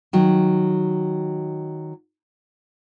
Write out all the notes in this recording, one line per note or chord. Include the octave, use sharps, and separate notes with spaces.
D#3 F#3